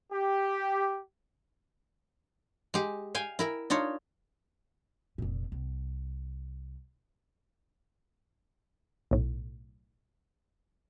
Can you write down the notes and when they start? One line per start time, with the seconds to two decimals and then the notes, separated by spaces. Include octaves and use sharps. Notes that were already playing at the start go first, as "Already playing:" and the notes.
0.12 G4
2.74 G#3 G4
3.15 F5 G5 G#5
3.39 E4 A#4 E5
3.70 D4 D#4 F4 C#5
5.18 F1 A#2
5.52 C2
9.11 B1 A2